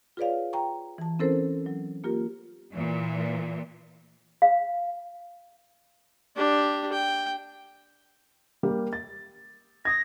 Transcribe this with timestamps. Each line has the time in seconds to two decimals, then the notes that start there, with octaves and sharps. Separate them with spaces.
0.17 F4 G#4 B4 C#5 D5 F5
0.53 G5 A#5 C#6
0.98 E3 A5
1.19 C4 C#4 E4 A4 A#4 C5
1.66 F#3
2.04 A#3 F4 G4 A#4
2.73 A#2 E3
4.42 F5
6.36 D4 G4
6.93 G5
8.63 G3 A#3 G4
8.93 A6
9.85 D#6 G#6 A#6